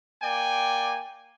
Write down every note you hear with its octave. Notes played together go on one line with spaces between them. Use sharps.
A#3 D5 G5 G#5